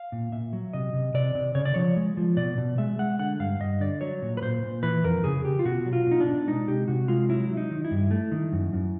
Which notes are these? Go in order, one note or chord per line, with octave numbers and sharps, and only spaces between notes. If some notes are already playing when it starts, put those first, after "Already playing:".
Already playing: F5
A#2
A#2 E5
F#3
C3 D#5
C3
C3 D5
C3
C#3 C#5
D5
F3 C#5
G#3
F3
B2 D5
B2
G#3 E5
G#3 F#5
D3 F#5
G2 F5
G2 D#5
D3 D5
F#3 C#5
A#2
B4
A#2 C5
A#2
E3 B4
F2 A#4
C#3 G#4
C#3 G4
F4
B2 F#4
F#3
F4
B2 D#4
D4
B2
G#3 D#4
C3 G4
C3 F#4
G#3 F4
F#3 E4
F#3
D#4
D#3
E4
G2
A3
D#3
F#2
F#2